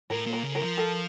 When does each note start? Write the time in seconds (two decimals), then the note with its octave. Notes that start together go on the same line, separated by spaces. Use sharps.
0.10 A2 A#4
0.27 A#2
0.33 A#4
0.45 C#3
0.55 A#4
0.61 F3
0.77 A4